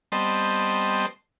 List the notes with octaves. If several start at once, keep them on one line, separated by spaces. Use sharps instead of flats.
G3 B3 C4 D#5 A5 C6